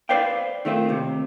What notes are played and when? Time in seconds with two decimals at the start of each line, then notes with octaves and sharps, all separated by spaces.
0.09 B4 C5 D5 F5 G5
0.65 D#3 A3 C4 F4
0.89 D#2 C3